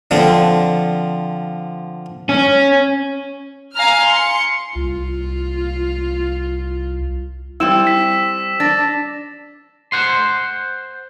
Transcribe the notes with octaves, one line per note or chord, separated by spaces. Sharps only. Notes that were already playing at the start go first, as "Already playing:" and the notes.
D3 F3 C4
C#4
F5 G#5 A#5 F6
C6 C#7
C2 F4
G3 C4 E4 E6 E7
B6
D4 A6 A#6
C5 F#5 C6